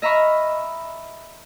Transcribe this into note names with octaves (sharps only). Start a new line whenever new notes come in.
D#5 E5 A#5 B5 C#6 F6